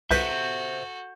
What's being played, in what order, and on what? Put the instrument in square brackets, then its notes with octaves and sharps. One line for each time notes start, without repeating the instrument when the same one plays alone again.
[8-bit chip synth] C2 B4 B6 [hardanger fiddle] F#4 A4 [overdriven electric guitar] C5 E5 [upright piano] G6